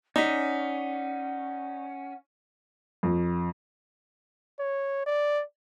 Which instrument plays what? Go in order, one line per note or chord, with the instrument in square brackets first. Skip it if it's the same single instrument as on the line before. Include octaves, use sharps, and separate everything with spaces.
[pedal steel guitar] C#4 [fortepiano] D#4 [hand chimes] D5 B6 [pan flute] F#5
[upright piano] F2
[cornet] C#5
D5